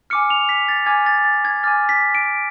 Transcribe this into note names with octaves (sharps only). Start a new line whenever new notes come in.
G#5 D6 F6 C#7
F7
B6
A6
G#5 D6 F6 G#6
A6
A6
G#6
G#5 D6 F6 A6
B6
D7